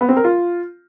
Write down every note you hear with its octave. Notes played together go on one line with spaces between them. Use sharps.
B3
C4
A#4
F4